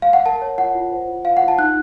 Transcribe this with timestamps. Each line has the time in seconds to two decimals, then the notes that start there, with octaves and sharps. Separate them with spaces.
0.02 F5
0.13 F#5
0.26 A#4 A5
0.42 C#5
0.58 F4 F#5
0.75 F4
0.92 C5
1.08 F4
1.25 F4 F5
1.37 F#5
1.43 F4
1.48 A5
1.58 D#4 F#6